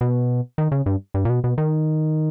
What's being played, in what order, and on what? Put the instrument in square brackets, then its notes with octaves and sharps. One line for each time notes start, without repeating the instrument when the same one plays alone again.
[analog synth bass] B2
D#3
C#3
G2
G2
A#2
B2
B2
D#3